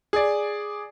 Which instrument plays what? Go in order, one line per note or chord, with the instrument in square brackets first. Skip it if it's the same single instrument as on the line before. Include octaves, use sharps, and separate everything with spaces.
[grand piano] G#4 D5